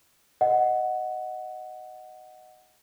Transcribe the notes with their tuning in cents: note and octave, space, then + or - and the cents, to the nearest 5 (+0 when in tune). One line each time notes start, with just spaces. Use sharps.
D#5 +0 F#5 +0